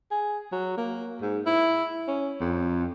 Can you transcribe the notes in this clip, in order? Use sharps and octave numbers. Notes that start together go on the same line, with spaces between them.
G#4
F#3
A#3
G#2
E4
C#4
F2